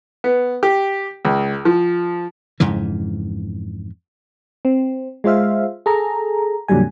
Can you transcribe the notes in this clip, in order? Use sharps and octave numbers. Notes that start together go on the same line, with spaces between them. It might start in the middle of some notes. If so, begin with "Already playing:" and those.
B3
G4
C#2
F3
F2 G#2 C#3 E3
C4
G#3 F4 C5 E5 F5
G#4 A4 A#5
F2 A#2 D3 F#3 G3 G#5